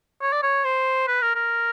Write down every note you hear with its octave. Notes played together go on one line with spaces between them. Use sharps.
C#5
D5
C#5
C5
B4
A#4
A#4